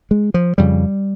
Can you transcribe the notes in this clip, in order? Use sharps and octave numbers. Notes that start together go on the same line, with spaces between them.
G#3
F3
F2 C#3 G3